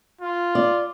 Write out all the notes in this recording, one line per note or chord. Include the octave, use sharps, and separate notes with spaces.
F4
D5